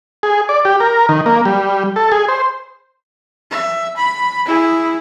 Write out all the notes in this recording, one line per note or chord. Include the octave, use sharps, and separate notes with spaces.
G#4
D5
G4
A#4
D#3
A#3
G3
A4
G#4
C5
E5
B5
E4 G#4